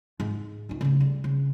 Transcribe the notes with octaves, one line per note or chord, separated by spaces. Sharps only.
G#2
C#2 D#4
C#3 A3
G3
C#3